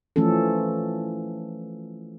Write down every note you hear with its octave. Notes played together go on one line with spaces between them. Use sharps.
E3 F3 A3 C#4 A4